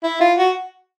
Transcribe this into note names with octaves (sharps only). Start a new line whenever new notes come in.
E4
F4
F#4